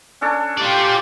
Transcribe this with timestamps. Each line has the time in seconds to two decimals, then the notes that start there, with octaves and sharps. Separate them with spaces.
0.21 C#4 D4 A4
0.57 F4 G4 D5